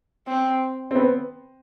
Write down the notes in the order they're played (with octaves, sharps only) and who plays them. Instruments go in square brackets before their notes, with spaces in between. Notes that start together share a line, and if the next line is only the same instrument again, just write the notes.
[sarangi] C4
[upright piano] C4
B3